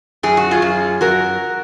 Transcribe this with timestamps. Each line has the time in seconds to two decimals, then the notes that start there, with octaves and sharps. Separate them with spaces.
0.23 F#2 G#4
0.37 F#4
0.51 F4 G#4
0.62 F#2
1.01 F#2 F#4 A#4